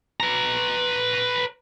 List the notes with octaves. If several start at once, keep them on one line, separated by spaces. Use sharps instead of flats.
B4 A#5